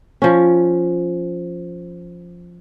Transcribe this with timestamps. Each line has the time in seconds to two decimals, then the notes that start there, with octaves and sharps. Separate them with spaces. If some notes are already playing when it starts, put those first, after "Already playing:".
0.22 F3 C#4